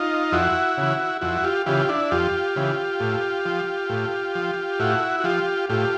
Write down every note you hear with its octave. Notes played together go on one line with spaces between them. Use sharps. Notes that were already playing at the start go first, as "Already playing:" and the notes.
Already playing: D#4 F4
F2 E4 F#4
C#3 E3
F2 E4 F#4
F4 G4
C#3 E3 F4 G4
D4 E4
F2 F4 G4
C#3 E3
A2
F3
A2
F3
A2 E4 F#4
F#4
F3 F4 G4
A2 F4 G4